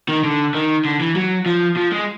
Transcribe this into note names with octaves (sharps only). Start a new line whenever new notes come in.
D#3
D3
D#3
D3
E3
F#3
F3
F3
G#3